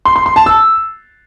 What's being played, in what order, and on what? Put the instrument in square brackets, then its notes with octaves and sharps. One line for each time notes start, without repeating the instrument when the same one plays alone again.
[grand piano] C6
C6
C6
A5
E6